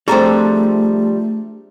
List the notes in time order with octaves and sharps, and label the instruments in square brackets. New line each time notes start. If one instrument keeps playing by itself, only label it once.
[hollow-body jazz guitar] F3 G3 [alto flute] A3 [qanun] C4 D4 A4 [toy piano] G#4 A#5